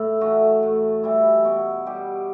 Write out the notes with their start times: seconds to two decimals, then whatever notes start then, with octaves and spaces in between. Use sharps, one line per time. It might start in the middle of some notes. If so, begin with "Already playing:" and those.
Already playing: A2
0.21 E3 A3 F#4
0.63 A2
1.03 E3 G3 E4
1.45 B2 F#4
1.86 G3 B3 G4